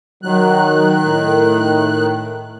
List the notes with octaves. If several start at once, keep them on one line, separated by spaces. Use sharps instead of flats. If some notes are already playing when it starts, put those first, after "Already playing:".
D#3 F#3 F#6
A2